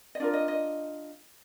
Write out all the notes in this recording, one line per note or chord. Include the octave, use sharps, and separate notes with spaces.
D#5
D4 F4 A#4 D5
D#5
D#5